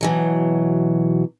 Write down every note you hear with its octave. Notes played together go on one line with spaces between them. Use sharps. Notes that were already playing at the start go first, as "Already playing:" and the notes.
B2 E3 F#3